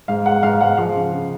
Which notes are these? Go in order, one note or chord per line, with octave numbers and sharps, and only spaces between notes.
G#2 F5
G#3 F#5
G#2 F5
G#3 F#5
F3 F5
C#3
C#3